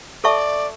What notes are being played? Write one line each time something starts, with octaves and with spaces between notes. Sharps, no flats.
A4 D5 E5 A5 C#6